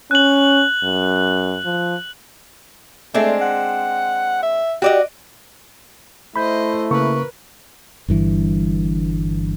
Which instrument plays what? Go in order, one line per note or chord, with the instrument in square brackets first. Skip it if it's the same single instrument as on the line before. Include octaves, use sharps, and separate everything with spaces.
[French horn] C#4 [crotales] F#6 F#7
[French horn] F#2
F3
[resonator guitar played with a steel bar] G#3 C4 D4 [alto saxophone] A3
[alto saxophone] F#5
E5
[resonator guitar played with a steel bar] F#4 D5 D#5 [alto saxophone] G4
[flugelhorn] A3 [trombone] E4 [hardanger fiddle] C5 D#5 [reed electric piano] B5 G6
[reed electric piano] C#3 A#3 C#6 [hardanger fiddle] A#4 B4
[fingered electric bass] G1 G2 E3